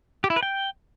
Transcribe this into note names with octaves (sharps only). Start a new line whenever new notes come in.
G4
E4
B4
G5